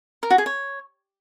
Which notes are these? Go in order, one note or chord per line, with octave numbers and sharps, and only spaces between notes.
A#4
F#4
G#4
C#5